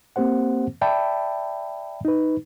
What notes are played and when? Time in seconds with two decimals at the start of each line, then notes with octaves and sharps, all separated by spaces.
0.16 A#3 C4 G4 C5 F#5
0.81 D5 E5 G5 A5 B5
2.05 D#4 B4